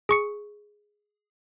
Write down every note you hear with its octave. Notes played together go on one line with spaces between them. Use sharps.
G#4 C#6 C#7